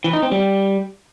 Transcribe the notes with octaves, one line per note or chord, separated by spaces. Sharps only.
E3
D#4
C4
G3